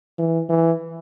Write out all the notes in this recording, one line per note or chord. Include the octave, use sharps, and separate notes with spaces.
E3
E3